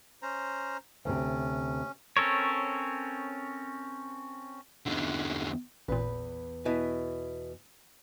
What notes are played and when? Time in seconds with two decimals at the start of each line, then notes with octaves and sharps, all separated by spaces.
0.22 C#4 C5 A#5
1.05 D2 A2 C3 C#4
2.17 C4 C#4 A4 A#4 C#5
4.86 E2 D3
5.88 A1 E2 A#2 B4
6.65 B2 E3